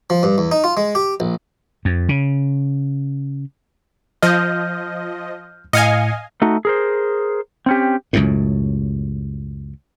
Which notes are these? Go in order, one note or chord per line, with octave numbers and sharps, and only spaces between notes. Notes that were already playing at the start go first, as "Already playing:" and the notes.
F3
G2
E2
D#4
F4
G#3
G4
A#1
F2
C#3
F3 D#5 F6 G6
A2 D#5 F5 G#5 C#7
A3 D#4 F#4
G#4 A#4 C5
C4 C#4 G4
C#2 F#2 A2